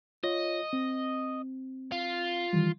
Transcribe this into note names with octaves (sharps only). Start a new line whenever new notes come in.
F4 C#5 D#5
C4
F4
D#3 E3 G3